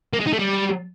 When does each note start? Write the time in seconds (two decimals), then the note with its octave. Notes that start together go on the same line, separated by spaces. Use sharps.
0.13 A#3
0.20 G#3
0.26 D#4
0.33 A3
0.39 G3